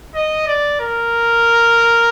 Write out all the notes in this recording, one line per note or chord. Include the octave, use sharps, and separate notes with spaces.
D#5
D5
A#4